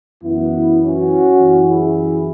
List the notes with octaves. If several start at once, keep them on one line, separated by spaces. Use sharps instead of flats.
F#2 E3 B3 E4
C#4 F#4
F#2 E3
E4 G#4